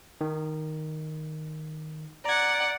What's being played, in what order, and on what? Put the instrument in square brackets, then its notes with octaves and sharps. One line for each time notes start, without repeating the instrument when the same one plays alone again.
[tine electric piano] D#3
[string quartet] D5 F#5 [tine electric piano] A#5 G#6